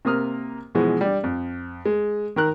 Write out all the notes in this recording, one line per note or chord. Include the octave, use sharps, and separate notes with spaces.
C3 A#3 A#4 D#6 F6
B2 E3 F3 G#3
G3 D4
F2
G#3
D#3 A#4 F#6